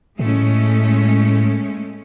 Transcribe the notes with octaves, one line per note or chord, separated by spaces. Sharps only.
A2 G#3 A3 C#4